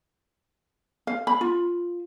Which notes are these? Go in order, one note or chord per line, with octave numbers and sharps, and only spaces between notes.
F5
B5
F4